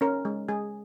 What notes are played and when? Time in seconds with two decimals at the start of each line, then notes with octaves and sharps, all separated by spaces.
0.01 C#4 A#4
0.25 G#3
0.49 G#3 G#4